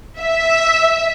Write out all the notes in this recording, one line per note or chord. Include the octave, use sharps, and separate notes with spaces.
E5